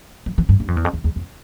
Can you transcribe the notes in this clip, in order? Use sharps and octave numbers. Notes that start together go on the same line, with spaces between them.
F3
E3
G2
G2
F2
E2
F2
E2
E2
F2